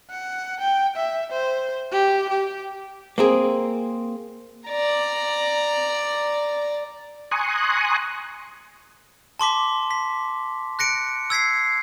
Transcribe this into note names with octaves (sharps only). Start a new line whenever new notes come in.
F#5
G5
E5
C5
G4
G4
A#3 C4 G#4
D5 A#5
G#5 A#5 C6 C#6 D#6 F#6
A5 C6 D6 B6
B6
F#6 A#6 C#7 D7
E6 G#6 B6 C7